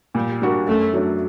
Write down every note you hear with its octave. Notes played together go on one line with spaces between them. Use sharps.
A#2 G3
G3 D4 F#4 A#4
F#2 A3
F#3 A3 D4